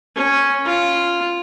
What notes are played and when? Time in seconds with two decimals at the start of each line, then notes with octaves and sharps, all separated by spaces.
0.16 C#4
0.65 F4